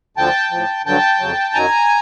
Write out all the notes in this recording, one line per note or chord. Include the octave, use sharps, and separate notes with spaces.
D2 D3 F3 G5 A5
A2 F3
G2 D3 F#3 G5 A5
F2 C#3 F#3
F#2 D#3 F#3 G#5 A#5